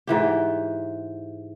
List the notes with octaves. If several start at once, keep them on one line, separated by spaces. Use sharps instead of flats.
G#2 E3 G4